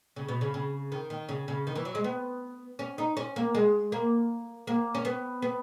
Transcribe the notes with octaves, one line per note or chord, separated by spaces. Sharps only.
C#3
B2
C#3
C#3
D#3
D#3
C#3
C#3
D#3
E3
F#3
G#3
B3
C#4
D#4
C#4
A#3
G#3
A#3
A#3
C#4
B3
B3